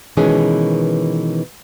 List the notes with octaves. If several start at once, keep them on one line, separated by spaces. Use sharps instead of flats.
B2 D#3 E3 G#3 C#4 G#4